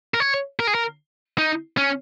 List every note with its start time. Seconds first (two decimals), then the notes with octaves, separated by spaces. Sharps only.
0.14 A#4
0.20 C#5
0.59 A#4
0.67 G#4
0.75 A#4
1.38 D#4
1.77 C#4